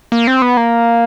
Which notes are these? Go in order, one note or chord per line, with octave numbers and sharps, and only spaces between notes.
A#3
C4
B3
A#3